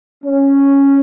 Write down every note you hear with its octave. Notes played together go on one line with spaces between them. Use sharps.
C#4